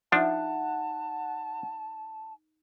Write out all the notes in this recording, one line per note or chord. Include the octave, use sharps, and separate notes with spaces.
F3 D4 D#4 E5 F#5 A5